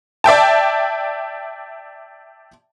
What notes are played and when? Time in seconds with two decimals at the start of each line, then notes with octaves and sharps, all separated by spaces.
0.24 D5 E5 G5 A5